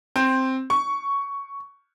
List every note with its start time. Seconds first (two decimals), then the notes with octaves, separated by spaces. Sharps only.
0.16 C4
0.70 C#6